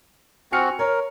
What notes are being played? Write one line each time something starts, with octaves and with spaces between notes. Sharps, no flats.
C4 F#4 G#5 F6 C#7
A#4 C#5